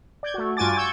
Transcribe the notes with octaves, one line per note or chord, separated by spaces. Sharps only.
D5 G6 G#6
A3 F#4
G2 F4 F#4 G#5 D6 A6
C#6 E6 G6 G#6